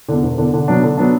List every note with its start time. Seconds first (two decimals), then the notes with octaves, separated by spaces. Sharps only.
0.09 E2 D3
0.23 E1
0.38 E2 D3
0.54 D3
0.68 F#3 B3 D4
0.83 D3
0.97 F#3 B3 D4